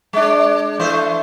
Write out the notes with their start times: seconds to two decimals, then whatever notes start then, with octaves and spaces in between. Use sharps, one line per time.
0.13 G#3 D4
0.79 E3 A3 C5